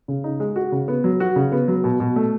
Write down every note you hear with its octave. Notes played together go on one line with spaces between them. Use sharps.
C#3
D#4
G#3
F#4
C#3
B3
F#3
F#4
C#3
B3
F#3
B2
B2
A3